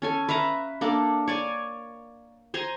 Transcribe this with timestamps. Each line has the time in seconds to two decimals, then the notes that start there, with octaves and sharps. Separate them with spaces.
0.02 C#4 A4 G#5
0.29 B4 E5 F5 A#5
0.81 A#3 D4 A4
1.28 C#5 D5 G#5
2.54 C5 G#5 A#5 C6